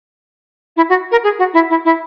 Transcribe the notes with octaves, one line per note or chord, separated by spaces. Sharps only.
E4
F#4
A#4
G#4
F#4
E4
E4
E4